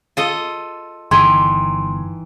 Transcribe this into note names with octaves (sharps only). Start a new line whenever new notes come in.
F4 A4 D#5
G1 D#3 E3 C6 G#6